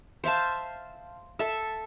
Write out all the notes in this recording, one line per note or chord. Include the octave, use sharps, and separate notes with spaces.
C5 E5 F5 A5
A4 E5